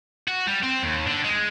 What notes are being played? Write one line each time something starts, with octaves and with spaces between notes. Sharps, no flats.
F#4
G3
C4
D#2
D3
G#3